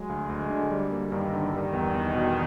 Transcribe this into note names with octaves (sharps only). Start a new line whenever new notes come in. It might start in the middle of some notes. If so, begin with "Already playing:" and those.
Already playing: F#3 G#3
D2
D2
D3
G3
A#3
G2 D#3
D3
D#3 G3
E2
E2
B2